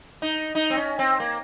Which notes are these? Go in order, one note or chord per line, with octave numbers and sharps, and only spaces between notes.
D#4
D#4
C4
C#4
C4
A#3